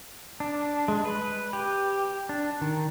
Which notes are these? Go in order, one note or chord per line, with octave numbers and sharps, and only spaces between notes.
D4
G#3
B4
G4
D4
D#3